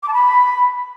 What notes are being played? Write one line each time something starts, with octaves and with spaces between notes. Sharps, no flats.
D6
A5
B5